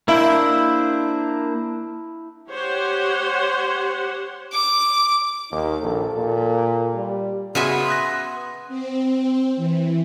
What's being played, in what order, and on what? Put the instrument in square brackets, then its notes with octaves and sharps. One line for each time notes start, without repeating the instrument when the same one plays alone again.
[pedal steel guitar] A#3 D4 C5 [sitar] E4
[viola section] G4 C5 C#5 F#5
[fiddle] D6
[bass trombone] D#2 [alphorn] D#4
[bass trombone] A#1 [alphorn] A4
[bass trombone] A#2
[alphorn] G3
[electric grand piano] C#3 F#4 [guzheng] B3 E5 G#5 [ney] C6
[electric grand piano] D#6 F#6 A#6
[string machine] C4
E3